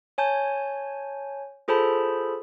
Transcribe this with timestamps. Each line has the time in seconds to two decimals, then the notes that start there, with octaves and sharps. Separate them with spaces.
0.18 C#5 G#5 A5 G6
1.68 F4 G#4 A4 C5 A5 B5